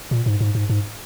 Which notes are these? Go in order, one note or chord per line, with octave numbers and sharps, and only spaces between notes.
A#2
G#2
G#2
G#2
G#2